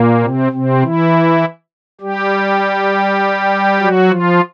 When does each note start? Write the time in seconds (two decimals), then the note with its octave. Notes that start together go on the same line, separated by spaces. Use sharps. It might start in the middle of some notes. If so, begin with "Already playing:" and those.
Already playing: A#2 A#3
0.23 C3 C4
0.52 C3 C4
0.82 E3 E4
2.01 G3 G4
3.80 F#3 F#4
4.09 F3 F4